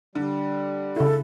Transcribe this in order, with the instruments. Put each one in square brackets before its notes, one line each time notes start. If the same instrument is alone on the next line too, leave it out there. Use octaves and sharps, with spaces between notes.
[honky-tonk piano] D3 [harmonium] G3
[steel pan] C#3 E4 [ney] A4